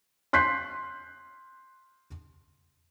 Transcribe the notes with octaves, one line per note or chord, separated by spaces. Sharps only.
C6 F#6 G6 B6 C7